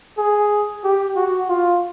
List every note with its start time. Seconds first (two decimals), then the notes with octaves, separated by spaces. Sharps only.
0.18 G#4
0.84 G4
1.16 F#4
1.49 F4